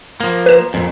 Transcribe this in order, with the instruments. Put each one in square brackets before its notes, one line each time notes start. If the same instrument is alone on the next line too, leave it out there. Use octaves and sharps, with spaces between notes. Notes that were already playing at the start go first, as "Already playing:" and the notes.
[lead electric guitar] F3 A#3
[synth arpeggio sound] B4 E7
[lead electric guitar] F2 A#2